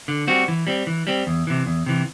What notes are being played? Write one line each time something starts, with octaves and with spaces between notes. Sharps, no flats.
D3
G3 C4 F#4
E3
G3 C4
E3
G3 C4
E2
C3 E3
E2
C3 E3